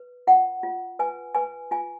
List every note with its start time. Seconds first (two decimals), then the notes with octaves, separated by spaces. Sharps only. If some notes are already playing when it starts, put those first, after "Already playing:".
Already playing: B4
0.27 F4 F#5
0.63 F4
0.99 B4 G#5
1.35 B4 G#5
1.71 F4 G#5